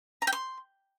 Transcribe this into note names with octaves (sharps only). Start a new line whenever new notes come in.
A#5
G5
C6